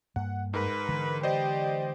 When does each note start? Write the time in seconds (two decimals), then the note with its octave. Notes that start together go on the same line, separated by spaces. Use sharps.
0.16 G2 A#3 F#5
0.54 G#2 A#4 B4
0.88 D3 E3 G#3
1.23 G4 C5 D5 D#5